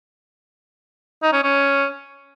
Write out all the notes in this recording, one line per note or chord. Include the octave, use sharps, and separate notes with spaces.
D#4
C#4
C#4